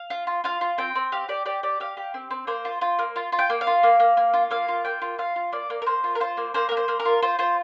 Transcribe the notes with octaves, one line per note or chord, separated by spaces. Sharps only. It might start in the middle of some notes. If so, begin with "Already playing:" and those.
Already playing: F5
F4
F4
F4 F5
F4
C4 G5
C4
G4 F5
G4 D5
G4 D5
G4 D5
G4 F5
G4
C4
C4
A#3 C5
F4
F4
A#3
F4
F4
G5
A#3
F5
F4
A#3
A#3
A#3
F4
A#3 F5
F4
A#3 G5
F4
F4 F5
F4
A#3 D5
A#3
A#4
A#3 C5
F4
A#4
F4 C5
A#3
A#3 C5
A#3 A#4
C5
A#3
A#4
F4
F4 C5
F4 C5